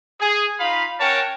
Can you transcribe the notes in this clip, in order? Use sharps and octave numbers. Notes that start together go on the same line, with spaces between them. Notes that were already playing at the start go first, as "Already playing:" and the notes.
G#4
D#4 F4 F5 B5
C#4 A#4 C#5 F#5 G5 A5